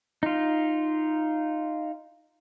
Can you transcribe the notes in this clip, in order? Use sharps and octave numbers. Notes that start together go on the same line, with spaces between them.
D#4 F4